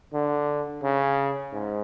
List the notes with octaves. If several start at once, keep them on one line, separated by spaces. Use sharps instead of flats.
D3
C#3
G#2